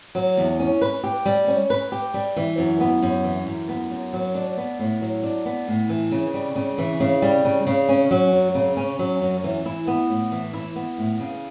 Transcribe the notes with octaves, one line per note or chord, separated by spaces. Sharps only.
F#3
E2
C#4
B4
G4
G3
C#4
B4
G4
G3
E3
F#2
B3
F#2
E3
F#2
B3
F#2
F#3
D4
B3
A2
F#3
D4
B3
A2
E3
C#3
G3
C#3
E3
C#3
G3
C#3
C#3
C#4
F#3
F#2
C#3
C#4
F#3
F#2
E3
E4
B3
A2
E3
E4
B3
A2
C#3